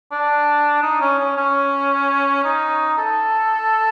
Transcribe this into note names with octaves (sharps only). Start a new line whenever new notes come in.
D4
D#4
C#4
C#4
C#4
D#4
A4